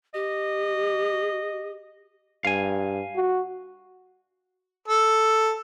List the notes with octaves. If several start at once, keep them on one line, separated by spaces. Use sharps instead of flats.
G4 D#5
G2 F5 G#5
F#4
A4